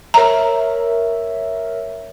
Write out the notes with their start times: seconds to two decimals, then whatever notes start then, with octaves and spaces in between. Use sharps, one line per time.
0.14 A#4 C#5 E5 A#5